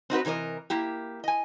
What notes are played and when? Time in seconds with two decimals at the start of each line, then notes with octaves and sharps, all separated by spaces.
0.10 C4 D#4 F#4 B4
0.25 C3 E3 A#4 C#5 D#5
0.70 A#3 E4 G4
1.24 D#5 G#5